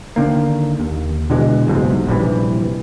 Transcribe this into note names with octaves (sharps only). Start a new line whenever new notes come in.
D3 D#3 A#3
D#2
B2 D3 E3 G#3
F#1 B1 G#2 C3
A#1 G2 C3 E3